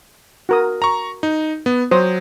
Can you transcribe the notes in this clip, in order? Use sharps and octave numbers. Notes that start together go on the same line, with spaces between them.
F#4 A#4 D#6
A#5 C#6
D#4
B3
F#3 C5 D#6